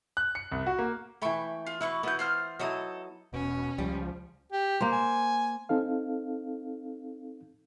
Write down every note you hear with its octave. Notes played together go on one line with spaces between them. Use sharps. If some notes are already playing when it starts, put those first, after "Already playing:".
F#6
C#7
C2
F#4
A#3
E3 A3 G5 B5 C#6
F4
E4 F#4 B4 C#6
B3 E4 F#4 B4 G6
F4 C5 F6
F#3 D#4 E4 A4 D#6
E1 B2 C#4
C#2 F3 G3
G4
A#3 C5
G#5
C4 D#4 A4 F5